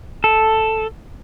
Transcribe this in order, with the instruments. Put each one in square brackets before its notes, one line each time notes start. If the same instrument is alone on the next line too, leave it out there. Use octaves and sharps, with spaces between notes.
[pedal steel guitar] A4